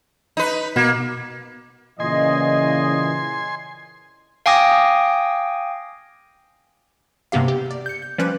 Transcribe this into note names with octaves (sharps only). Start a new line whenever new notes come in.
D#4 B4
B2 A#3 G#6
A#2 C#3 E3 D#5 G#5 C6
F5 G5 G#5 D6 D#6 A#6
G2 C3 A#3 B3 G4 F5
G4
D5
G6 C#7
G6
F3 G3 C#4 B4 D6 F#6